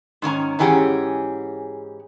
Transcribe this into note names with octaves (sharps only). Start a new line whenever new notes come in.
G#2 D#3 C#4 A#5
G#2 E3 C#4 G4 G#4 F#5